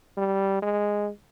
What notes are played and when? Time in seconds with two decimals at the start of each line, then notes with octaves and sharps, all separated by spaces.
0.17 G3
0.62 G#3